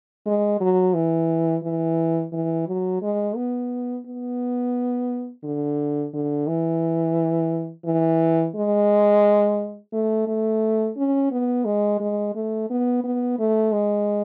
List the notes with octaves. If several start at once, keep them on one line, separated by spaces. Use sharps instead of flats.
G#3
F#3
E3
E3
E3
F#3
G#3
B3
B3
D3
D3
E3
E3
G#3
A3
A3
C#4
B3
G#3
G#3
A3
B3
B3
A3
G#3